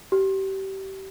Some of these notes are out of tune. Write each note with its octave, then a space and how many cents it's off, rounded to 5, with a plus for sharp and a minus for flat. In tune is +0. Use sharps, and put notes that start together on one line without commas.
G4 -30